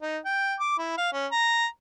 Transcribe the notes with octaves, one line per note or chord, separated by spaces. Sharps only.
D#4
G5
D6
E4
F5
C#4
A#5